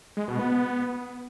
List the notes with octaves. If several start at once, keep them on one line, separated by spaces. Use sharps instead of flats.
G#3
B2
B3